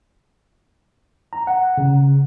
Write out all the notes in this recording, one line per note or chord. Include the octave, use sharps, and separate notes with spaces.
A#5
F#5
C#3